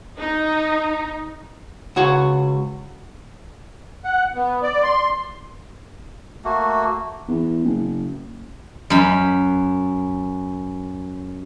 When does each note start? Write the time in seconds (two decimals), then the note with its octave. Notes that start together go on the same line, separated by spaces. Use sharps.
0.19 D#4
1.96 C#2 F#4 C#5
4.04 F#5
4.35 B3
4.63 D5
4.83 C6
6.44 A3 A#3 F#4
7.28 E2
7.63 F#1
8.90 F#2 B5